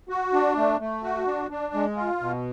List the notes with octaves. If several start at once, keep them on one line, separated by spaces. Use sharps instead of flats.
F#4
D4
A3
A3
F#4
D4
D4
G#3
F4
B2